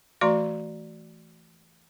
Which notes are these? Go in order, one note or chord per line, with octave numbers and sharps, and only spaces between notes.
E3 A3 F#4 D5 A#5 C6